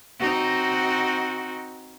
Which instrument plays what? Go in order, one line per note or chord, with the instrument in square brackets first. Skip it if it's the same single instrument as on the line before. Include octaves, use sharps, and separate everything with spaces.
[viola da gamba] C4 D#4 F#4